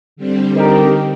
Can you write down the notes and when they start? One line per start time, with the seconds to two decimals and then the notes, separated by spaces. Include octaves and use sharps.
0.16 D3 G3 C4
0.56 D#4 G4 A#4